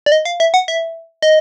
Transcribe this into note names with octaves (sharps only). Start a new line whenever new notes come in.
D5
D#5
F5
E5
F#5
E5
D#5